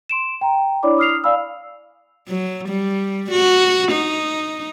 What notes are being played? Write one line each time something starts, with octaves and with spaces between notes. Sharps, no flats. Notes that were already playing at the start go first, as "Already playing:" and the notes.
C6 D7 E7
G5 A#5
D4 E4 C#5 D5 B5 D6
D#6 F6 C7 F7
D5 F5 G#5 B5 E6
F#3
G3
F#4
D#4